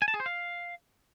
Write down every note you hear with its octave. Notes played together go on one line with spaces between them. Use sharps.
G#5
A5
G#4
C5
F5